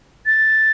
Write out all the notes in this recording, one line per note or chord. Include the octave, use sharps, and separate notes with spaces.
A6